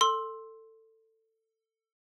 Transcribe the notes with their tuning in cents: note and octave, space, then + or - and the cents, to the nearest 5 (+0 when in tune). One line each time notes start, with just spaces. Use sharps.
A4 +20 C6 +10 E6 -5